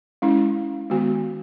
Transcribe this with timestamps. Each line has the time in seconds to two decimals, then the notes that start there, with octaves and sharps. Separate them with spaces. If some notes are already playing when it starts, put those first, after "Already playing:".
0.22 G#3 C#4 E4
0.90 D#3 G#3 B3 F#4